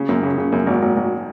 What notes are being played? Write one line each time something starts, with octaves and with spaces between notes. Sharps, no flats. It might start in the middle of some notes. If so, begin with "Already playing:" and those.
Already playing: C#3
F#2
C#3
C#3
F#2
G#1
G#1
G#1